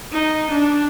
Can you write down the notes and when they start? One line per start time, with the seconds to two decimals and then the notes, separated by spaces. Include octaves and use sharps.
0.12 D#4
0.50 D4